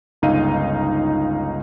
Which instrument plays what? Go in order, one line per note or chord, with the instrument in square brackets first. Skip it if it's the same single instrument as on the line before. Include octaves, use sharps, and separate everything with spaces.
[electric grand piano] G1 C#2 D#4 F5 D#7